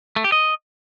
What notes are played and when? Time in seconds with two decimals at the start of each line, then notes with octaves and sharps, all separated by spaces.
0.16 A3
0.24 G4
0.32 D#5